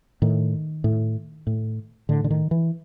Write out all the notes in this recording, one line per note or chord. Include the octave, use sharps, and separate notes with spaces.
A2 D#3
A2
A2
A2 D3
D3
D#3
E3